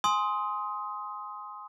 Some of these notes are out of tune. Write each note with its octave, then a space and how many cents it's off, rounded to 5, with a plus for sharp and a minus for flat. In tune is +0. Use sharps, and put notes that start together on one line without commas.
G#5 +0 C6 +0 D#6 +20